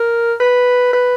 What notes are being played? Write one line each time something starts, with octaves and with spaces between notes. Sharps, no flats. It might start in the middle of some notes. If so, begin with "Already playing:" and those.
Already playing: A#4
B4
B4